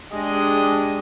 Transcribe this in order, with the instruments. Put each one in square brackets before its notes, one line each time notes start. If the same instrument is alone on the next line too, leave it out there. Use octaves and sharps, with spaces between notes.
[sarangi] G#3 [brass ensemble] D4 G4 D#5